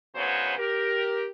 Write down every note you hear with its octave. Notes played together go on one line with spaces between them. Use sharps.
D2 C#3 F#3 B3 C5 C#5
G4 A#4